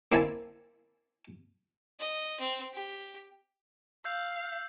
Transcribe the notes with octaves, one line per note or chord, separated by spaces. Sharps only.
A#3 C4 E4 G#5 A5
D#5
C4
G4
F5 E6 G6 C7